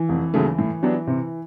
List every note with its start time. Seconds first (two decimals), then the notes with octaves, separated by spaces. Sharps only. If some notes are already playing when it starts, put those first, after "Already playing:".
Already playing: E3
0.09 F1
0.34 D#2 C#3 F#3 A3
0.59 A2
0.83 F#3 B3 D4 G4
1.07 C3